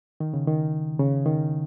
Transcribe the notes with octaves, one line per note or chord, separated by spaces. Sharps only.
D#3
C#3
D#3
C#3
D#3